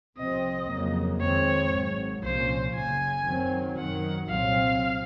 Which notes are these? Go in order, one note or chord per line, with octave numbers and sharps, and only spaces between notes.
C2 C3 F3 C4 D#5
F2 C#3 F#3 A#3
F2 D#3 G#3 C4 C#5
G#1 G#2 F#3
C2 A#2 F3 A#3 C#4 C5
F#1 F#2 C#3 G#5
F#2 D#3 F#3 C4
F#2 D#3 F#3 F#5
C2 A#2 F#3 C4 F5